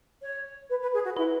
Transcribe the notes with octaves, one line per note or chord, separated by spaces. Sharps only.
C#5
B4
B4
G#4
F#4
E4 B4